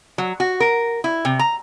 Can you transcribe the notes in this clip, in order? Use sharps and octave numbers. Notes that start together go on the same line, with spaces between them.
F#3
F#4
A#4
E4
C3
A#5